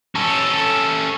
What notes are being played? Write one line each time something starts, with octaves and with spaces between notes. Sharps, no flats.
C#4 A4